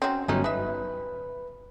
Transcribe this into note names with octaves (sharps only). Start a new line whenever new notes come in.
F#3 C4 C#4
G1 F#3 A3 C#4 D#4
D#4 B4 E5